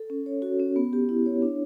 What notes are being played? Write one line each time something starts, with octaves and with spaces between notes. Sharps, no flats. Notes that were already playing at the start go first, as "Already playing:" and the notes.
Already playing: A4
C#4
C#5
F#4
C#4
B3
G4
E4
C#5
D4